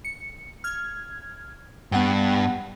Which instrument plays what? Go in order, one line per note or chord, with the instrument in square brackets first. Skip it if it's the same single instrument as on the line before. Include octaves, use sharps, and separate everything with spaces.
[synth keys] C#7
F6 G#6
[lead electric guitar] G2 [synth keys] B3 F#5 G5